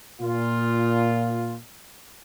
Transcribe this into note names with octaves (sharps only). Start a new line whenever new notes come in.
A#2 F4